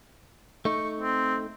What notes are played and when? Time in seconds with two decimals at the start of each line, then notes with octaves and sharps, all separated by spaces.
0.65 A3 D#4 C#6
1.01 C4